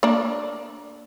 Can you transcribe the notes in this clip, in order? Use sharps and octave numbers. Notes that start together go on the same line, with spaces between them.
A#3 D4